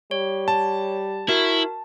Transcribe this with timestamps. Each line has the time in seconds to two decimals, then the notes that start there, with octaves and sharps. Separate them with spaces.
0.11 G3 C#5
0.48 A5
1.29 E4 F#4 A#4